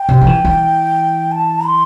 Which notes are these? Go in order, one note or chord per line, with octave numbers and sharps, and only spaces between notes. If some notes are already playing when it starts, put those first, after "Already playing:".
Already playing: G5
C3
F3
E3
E3
A5
C6